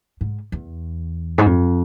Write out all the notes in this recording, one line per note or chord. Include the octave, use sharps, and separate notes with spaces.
G#2
E2
G#2
F2